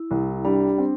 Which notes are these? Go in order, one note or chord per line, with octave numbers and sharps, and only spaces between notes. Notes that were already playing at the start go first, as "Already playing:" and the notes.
Already playing: E4
C2
G3 D4
C4